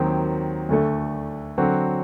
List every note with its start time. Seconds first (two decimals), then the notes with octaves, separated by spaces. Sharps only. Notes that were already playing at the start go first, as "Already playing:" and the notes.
Already playing: D#2 D#3 F#3 C4
0.69 D2 D3 A3
1.58 D3 F#3 C4 F#4